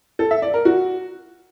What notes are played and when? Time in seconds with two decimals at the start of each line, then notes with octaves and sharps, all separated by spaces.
0.19 A4
0.31 E5
0.42 D5
0.54 A#4
0.65 F#4